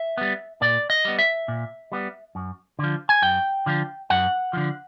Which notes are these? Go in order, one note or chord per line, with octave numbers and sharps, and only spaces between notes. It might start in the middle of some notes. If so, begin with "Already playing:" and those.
Already playing: E5
G3 B3
A#2 D5
D#5
G3 B3
E5
A#2
G3 B3
F#2
D3 F3
G#5
F#2 G5
D3 F3
F#2 F#5
D3 F3